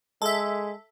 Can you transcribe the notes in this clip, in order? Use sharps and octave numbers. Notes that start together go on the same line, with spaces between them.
G#3 A4 E5